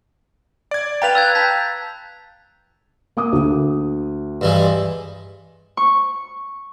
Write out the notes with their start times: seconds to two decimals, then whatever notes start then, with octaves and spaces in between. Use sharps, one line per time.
0.71 D5 G#6
1.02 B4 F5 G5 A#5 A6 F7
1.15 E6 F#6 G#6
1.35 A5 G6 B6
3.17 A#3 D6 D#6
3.33 D2
4.41 G2 E3 G#3
5.77 C#6